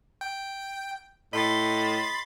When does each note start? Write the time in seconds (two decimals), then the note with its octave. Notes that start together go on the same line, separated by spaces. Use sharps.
0.21 G5
1.33 A2 D#5 B5 C6 A6